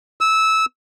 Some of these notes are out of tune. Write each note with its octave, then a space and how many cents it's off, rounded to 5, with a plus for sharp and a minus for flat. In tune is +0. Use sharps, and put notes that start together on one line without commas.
E6 -15